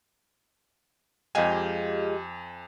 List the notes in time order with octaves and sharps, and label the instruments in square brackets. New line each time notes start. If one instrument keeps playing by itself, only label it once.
[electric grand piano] F2 G#5 [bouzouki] G#3 F4 G4